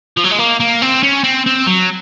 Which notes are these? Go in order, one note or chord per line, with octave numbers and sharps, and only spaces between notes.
F3
F#3
G#3
A#3
A#3
C4
C#4
C4
C4
F#3